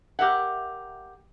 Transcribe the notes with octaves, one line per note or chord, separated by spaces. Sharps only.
G4 A#4 E5 F#5